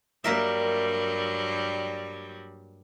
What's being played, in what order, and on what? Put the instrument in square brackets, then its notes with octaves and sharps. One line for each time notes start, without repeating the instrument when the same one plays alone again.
[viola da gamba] G2 F#3 G3 [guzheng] A#3 A#4 E5